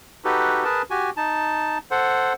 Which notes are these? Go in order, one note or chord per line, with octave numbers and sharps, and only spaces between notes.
D#4 F#4 G4 A4 B4
G#4 A#4 B4 A5
F#4 G4 G#5
D#4 A5
A4 C5 F#5